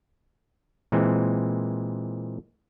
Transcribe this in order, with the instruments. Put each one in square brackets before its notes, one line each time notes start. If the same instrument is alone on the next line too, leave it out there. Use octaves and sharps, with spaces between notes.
[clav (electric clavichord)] A#2 E3 G#3 C4